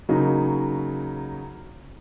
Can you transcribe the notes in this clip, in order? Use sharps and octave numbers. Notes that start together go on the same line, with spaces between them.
C#3 F#3 A#3 D#4